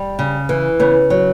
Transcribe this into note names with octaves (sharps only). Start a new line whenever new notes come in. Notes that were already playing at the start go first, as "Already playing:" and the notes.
Already playing: G3
C#3
E3
C#3 B3
F#3